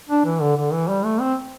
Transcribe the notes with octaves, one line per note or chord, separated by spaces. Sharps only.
D4
E3
D3
D3
E3
G3
A3
C4